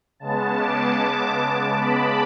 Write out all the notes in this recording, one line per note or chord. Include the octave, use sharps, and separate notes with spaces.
C#3 G#3 B3 A5
D6
B5